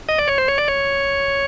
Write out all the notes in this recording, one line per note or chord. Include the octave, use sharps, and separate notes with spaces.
D#5
D5
C#5
C5
C#5
D5
C#5